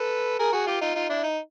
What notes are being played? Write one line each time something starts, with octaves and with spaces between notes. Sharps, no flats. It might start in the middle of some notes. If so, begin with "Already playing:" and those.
Already playing: A4 B4
G#4 A#4
F#4 G#4
F4 G4
D#4 F4
D#4 F4
D4 E4
D#4